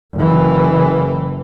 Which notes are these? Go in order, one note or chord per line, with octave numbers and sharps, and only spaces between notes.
F#1 E3